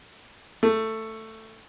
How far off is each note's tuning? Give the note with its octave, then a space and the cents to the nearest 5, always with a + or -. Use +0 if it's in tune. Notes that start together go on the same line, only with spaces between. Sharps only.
A3 +10